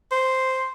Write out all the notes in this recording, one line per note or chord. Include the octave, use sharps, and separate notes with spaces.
C5